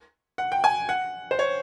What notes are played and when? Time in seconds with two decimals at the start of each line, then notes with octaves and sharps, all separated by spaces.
0.38 F#5
0.52 G5
0.64 G#5
0.89 F#5
1.31 C5
1.39 C#5